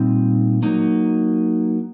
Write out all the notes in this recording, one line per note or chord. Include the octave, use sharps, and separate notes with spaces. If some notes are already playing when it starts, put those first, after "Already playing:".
Already playing: A#2 G3 C4 D#4
F#3 A#3 D#4